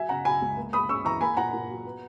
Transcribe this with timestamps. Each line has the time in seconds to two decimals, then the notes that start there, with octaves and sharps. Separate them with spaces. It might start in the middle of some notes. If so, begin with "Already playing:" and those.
Already playing: F#3 E5 G#5
0.09 C#3 F#5 A#5
0.25 F#3 G#5 B5
0.42 C#2
0.57 A#3
0.73 A#3 B5 D#6
0.89 C#4 C#6 E6
1.05 E3 A#5 C#6
1.21 A#3 G#5 B5
1.37 A#2 F#5 A#5
1.53 A#2
1.69 F#3
1.85 B3